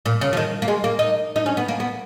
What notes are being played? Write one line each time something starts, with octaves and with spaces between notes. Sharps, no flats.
A#2
C#3
F3
D#3
A#3
G#3
A#3
D#4
D#4
C#4
B3
A#3
B3